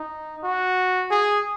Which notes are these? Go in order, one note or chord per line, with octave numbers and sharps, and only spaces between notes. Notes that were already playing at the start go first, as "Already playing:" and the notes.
Already playing: D#4
F#4
G#4